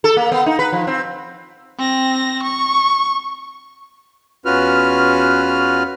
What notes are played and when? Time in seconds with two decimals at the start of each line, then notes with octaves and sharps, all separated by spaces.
0.04 A4
0.17 A#3
0.32 B3
0.46 D#4
0.59 B4
0.72 F3
0.87 C4
1.78 C4 A#6
2.43 C#6
4.46 E2 C#4 F4 F#4 B4 F6